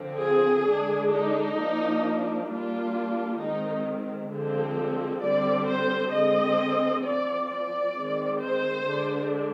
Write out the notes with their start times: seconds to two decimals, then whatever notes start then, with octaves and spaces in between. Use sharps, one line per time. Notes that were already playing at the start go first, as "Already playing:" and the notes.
Already playing: D3 F3 C4
0.21 G#4
0.67 D3 G#3 D4
1.13 D#4
1.58 F3 A#3 D4
2.48 G3 A#3 D4 F4
3.39 D#3 G#3 C4 D#4
4.30 D3 F3 G#3 C4
5.21 D3 G3 C4 D5
5.67 C5
6.12 D3 G#3 C4 D#5
7.03 F3 C4 D5
7.49 D5
7.94 D#3 G#3 C4
8.40 C5
8.85 D3 G#3 D4